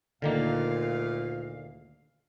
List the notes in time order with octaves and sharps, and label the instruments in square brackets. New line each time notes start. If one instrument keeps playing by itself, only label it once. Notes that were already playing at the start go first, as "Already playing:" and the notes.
[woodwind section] D2 A#2 F5 [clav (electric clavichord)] D3 D#3 A#3